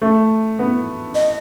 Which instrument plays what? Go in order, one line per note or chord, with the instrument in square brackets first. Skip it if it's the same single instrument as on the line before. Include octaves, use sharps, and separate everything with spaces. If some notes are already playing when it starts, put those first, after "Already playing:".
[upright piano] A3
B3
[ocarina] D#5